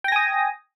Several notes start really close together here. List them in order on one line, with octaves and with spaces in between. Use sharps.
G5 A#6 G#5 D#6